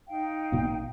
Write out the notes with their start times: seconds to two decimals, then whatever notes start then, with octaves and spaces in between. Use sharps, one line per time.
0.08 D#4 F5 G5
0.52 A1 A#2 B3